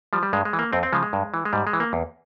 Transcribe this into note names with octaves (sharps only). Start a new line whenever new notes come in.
F3 G3
G3
G2 G#3
G#3
E3
A#3
F2 C4
C4
C#3 F3 G#3
G#3
G2
E3
G#3
G#2 G3
G#3
E3
A#3
E2